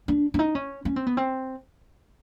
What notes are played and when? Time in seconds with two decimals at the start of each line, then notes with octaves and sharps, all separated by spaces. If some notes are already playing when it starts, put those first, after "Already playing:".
0.08 D4
0.34 D4
0.39 D#4
0.55 C#4
0.85 C#4
0.96 C4
1.07 B3
1.17 C4